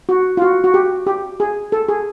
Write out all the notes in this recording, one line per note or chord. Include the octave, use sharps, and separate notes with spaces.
F#4
F4
F#4
F#4
G4
G4
G#4
A4
G#4